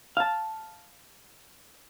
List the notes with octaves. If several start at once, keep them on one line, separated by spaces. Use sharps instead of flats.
F5 A5